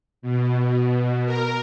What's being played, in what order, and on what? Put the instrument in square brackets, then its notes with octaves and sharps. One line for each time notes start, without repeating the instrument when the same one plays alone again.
[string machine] B2
A#4